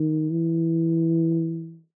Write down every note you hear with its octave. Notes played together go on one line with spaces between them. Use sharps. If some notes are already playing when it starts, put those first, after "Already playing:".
Already playing: D#3
E3